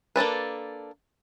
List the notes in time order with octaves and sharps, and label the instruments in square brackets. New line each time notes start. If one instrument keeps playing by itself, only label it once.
[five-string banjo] A#3 D4 A4 B4